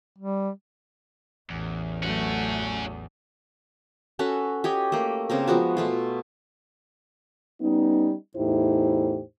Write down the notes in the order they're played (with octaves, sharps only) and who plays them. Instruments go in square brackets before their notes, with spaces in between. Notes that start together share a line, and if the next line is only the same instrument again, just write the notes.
[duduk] G3
[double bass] A1 [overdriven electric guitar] E2
[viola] F#3 A3 [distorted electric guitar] C#4 F#4
[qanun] C#4 F#4 A4 B4
G4 C#5 D#5
A3 A#3
C#3 A#3 C4 A#4
F3 G#3 B3 F#4
B2 A3 F4
[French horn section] G3 B3 C#4 D#4
E2 A2 D#4 E4 G4 C5